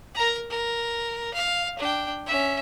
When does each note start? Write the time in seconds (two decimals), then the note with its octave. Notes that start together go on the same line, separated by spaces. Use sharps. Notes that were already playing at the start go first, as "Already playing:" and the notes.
0.15 A#4 A#5
0.50 A#4
1.34 F5
1.79 D4 G5
2.26 C#4 E5